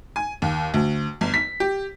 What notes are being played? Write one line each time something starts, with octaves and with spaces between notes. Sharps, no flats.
G#5
D#2
D2
G1
B6
G4